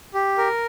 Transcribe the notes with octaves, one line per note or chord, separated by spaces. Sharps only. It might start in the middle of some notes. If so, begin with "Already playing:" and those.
G4
A#4